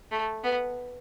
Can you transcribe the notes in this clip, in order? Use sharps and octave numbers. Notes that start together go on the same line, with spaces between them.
A3
B3